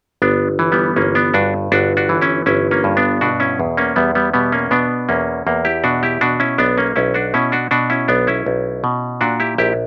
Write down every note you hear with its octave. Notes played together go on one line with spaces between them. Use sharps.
G1 B3 D4
E3
G3 B3
G1 A#3 C#4
B3 D4
G2 D4 F#4
G1 D4 F#4
D4 F#4
E3
C#4 E4
G1 C#4 E4
A#3 C#4
G2
B3 D4
B2 D4 F#4
C#4 E4
E2
A#3 C#4
E2 G3 B3
G3 B3
B2 G3 B3
A#3 C#4
B2 B3 D4
E2 A#3 C#4
E2 A#3
E4 G4
B2 D4 F#4
E4 G4
B2 D4 F#4
C#4 E4
B1 B3 D4
A#3 C#4
B1 C#4 E4
D4 F#4
B2 C#4 E4
D4 F#4
B2 D4 F#4
C#4 E4
B1 B3 D4
C#4 E4
B1
B2
A#2 D4 F#4
E4 G4
A#1 E4 G4